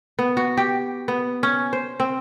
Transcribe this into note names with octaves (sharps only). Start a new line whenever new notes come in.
B3
F#4
G4
B3
C#4
C5
C4